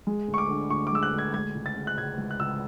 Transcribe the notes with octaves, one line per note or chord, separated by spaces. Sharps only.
G#3
D2
C#6
D6
D3
D2 C#6
D6
G#3 E6
F#6
D2
G#6
G#3 G#6
C#2
A6
C#3
F#6
C#2 G#6
G#3
F#6
C#2 E6